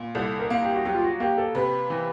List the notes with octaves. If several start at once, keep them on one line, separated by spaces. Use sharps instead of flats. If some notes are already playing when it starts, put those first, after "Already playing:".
Already playing: A#2
C2 A4
A#4
A#3
G4
F#4
F#3 G4
F4
F#4
A#3 G4
A4
C3 B4
E3